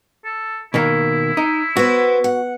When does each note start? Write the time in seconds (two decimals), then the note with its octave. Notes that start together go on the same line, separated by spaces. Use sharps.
0.25 A4
0.74 B2 D#3 A#3 E4
1.37 D#4
1.77 B3 F#4 C5
2.24 F#5